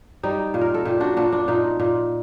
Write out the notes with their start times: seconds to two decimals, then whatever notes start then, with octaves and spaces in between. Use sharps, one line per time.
0.23 G3 D#4
0.54 A#2
0.61 A#4
0.74 A4
0.85 A#2 G4
1.00 D4 F#4
1.17 A#2 D4 F#4
1.32 D4
1.48 A#2 D#4
1.80 A#2